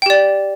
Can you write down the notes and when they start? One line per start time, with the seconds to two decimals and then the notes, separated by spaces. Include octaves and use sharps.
0.02 G5
0.06 G4
0.10 D5